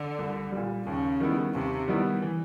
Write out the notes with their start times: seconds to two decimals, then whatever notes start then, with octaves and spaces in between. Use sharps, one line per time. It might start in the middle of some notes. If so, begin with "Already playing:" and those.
Already playing: D3
0.19 C2
0.52 G3
0.57 A#2
0.87 D#2 C#3
1.20 D#3 G3 B3 E4
1.54 D#2 C3
1.88 D#3 G3 B3 E4
2.22 E3